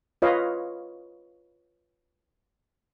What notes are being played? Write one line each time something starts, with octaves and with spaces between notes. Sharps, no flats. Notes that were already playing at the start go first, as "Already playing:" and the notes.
F4 B4 C#5 D#5 F5